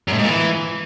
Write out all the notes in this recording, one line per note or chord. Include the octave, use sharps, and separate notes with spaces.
F#2
A2
G#2
A#2
E3